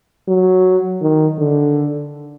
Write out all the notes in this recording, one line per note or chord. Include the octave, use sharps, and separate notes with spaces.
F#3
D#3
D3